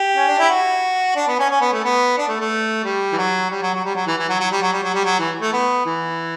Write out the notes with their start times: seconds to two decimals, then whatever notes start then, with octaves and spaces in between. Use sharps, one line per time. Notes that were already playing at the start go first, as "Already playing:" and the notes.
Already playing: G4
0.16 C#4
0.28 D4
0.39 E4
0.49 F#4
1.16 D4
1.27 B3
1.39 C#4
1.50 C#4
1.61 B3
1.72 A3
1.84 B3
2.18 D4
2.28 A3
2.40 A3
2.84 G3
3.12 E3
3.17 F#3
3.50 G3
3.62 F#3
3.73 F#3
3.84 G3
3.95 F#3
4.06 E3
4.18 E3
4.29 F#3
4.40 F#3
4.51 G3
4.61 F#3
4.72 G3
4.83 F#3
4.93 G3
5.04 F#3
5.19 E3
5.41 A3
5.53 B3
5.86 E3